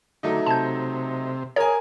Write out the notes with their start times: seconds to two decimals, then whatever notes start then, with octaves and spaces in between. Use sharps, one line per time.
0.23 D3 F#3 A3 D#4
0.47 C3 A5 G6
1.56 G#4 A#4 C#5 G#5